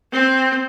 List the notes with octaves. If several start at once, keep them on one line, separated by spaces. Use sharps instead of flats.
C4